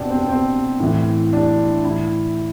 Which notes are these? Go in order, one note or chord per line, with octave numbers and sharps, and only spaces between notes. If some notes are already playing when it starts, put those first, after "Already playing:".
Already playing: B2 C4 D4
C4
C4
A2 E3
D4
A2 E3 E4